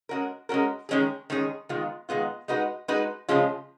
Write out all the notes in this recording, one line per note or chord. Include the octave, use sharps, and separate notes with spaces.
G#3 C#4 F#4 A#4
G#3 C#4 F#4 A#4
D#3 G#3 C#4 G#4
D#3 G#3 C#4 G#4
D#3 G#3 B3 F4
D#3 G#3 B3 F4
G#3 D#4 F#4 B4
G#3 D#4 F#4 B4
C#3 F3 G#3 C#4 F4